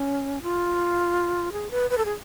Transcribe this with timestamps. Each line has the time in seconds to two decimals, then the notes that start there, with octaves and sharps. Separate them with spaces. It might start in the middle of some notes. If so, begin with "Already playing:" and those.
Already playing: C#4
0.42 F4
1.52 G#4
1.71 B4
1.90 B4
1.98 A4
2.05 G#4